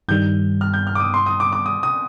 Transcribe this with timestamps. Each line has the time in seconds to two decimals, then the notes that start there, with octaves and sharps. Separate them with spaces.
0.08 G2 D#3 G3 G6
0.61 F6
0.74 G6
0.87 F6
0.95 D6
1.00 D#6
1.14 C6
1.26 D#6
1.40 D6
1.53 D6
1.66 D#6
1.83 D#6